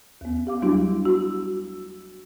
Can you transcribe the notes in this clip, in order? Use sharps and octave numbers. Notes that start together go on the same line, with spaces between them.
D#2 B3
G4 F5 D6
F#3 G3 A3 D4 E4 F#4
F#4